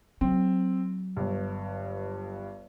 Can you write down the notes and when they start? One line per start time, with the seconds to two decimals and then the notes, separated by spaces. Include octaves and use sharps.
0.21 F#3 C4
1.17 G1 G2